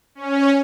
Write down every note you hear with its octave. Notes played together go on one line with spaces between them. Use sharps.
C#4